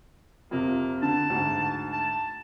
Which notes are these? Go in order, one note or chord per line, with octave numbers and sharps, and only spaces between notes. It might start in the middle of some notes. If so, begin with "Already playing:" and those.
F2 C3 F3 A#3
D3 A5
D2 G#2
A5